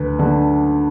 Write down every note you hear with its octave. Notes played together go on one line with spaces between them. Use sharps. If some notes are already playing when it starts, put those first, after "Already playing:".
Already playing: D2 B4
D3